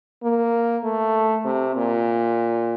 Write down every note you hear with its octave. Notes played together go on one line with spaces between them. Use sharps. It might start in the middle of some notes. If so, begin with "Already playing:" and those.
A#3
A3
C3
A#2